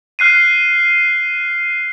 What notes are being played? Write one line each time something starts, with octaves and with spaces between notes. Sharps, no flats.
F6 F#6 C7 D#7